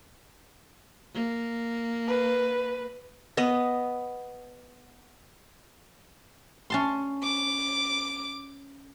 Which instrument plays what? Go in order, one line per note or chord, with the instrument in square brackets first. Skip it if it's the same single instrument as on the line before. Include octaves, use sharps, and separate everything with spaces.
[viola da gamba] A#3
[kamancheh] B4
[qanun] B3 D#5
[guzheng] C#4 A5 C6
[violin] D6